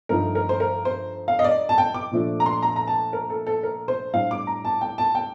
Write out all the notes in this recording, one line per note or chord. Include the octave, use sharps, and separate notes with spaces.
G2 F3 A3 D#4 A#4
A#4
C5
A#4
C5
F5
D#5
D5
A5
G5
D6
A#2 F3 A3 D4
A#5
C6
A#5
A#5
A5
A#4
A4
A4
A#4
C5
A2 G3 D4 F5
D6
A#5
A5
G5
A5
G5